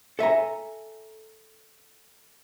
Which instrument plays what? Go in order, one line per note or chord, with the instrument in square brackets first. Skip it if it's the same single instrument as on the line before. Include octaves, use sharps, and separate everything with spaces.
[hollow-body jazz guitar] A4 E5 G#5 A#5